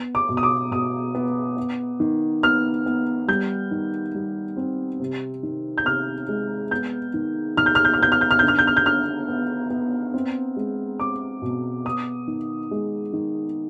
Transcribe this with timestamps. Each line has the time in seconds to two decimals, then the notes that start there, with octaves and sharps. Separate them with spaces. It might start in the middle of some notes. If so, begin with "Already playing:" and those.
Already playing: B3
0.15 D6
0.29 B2
0.37 D#6
0.43 D6
0.71 B2 D#6
1.15 B3
1.57 B3
2.00 D#3
2.43 B3 F6
2.86 B3
3.28 G3 G6
3.71 D#3
4.15 G3
4.57 C4
5.00 C3
5.43 D#3
5.78 G6
5.85 C3 F6
6.29 G#3
6.71 B3 G6
7.14 D#3
7.57 D#3 F6
7.66 G6
7.75 F6
7.85 G6
7.94 F6
8.00 B3 G6
8.12 F6
8.21 G6
8.31 F6
8.39 D3 G6
8.48 F6
8.59 G6
8.67 F6
8.77 G6
8.86 D3 F6
9.28 B3
9.70 B3
10.14 C4
10.57 G#3
11.00 C4 D6
11.42 B2
11.85 B3 D#6
12.27 D#3
12.71 G#3
13.13 D#3